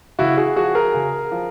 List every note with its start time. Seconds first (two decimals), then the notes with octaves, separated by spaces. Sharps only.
0.19 C#3 E4 F#4
0.37 F#4 G#4
0.56 F3 F#4 G#4
0.75 G#4 A#4
0.94 C#3
1.32 F3